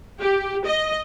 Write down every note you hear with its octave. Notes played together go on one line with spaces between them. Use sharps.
G4
D#5